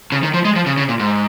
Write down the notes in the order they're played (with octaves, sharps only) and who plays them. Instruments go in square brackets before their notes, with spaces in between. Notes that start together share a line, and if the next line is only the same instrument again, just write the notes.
[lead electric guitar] C#3
D#3
F3
G#3
F3
C#3
C#3
A#2
G#2